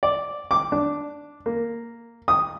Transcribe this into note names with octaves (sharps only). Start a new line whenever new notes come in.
D5
D6
D4
A#3
D#6